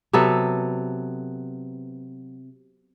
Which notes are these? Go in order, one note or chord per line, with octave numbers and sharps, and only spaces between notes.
C3 F#3 B3 A4